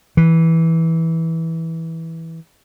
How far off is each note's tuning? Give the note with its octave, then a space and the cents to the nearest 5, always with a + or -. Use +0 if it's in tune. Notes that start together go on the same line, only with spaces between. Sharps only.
E3 -10